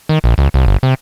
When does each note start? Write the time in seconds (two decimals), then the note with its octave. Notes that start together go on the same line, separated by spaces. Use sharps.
0.09 D#3
0.24 A#1
0.38 C#2
0.54 C2
0.66 G1
0.83 C3